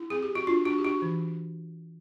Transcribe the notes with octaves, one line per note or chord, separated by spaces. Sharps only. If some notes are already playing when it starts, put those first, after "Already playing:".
Already playing: E4
C4 G#4
G4
C4
F#4
D4 F4
D4 F#4
G4
D4 F#4
E3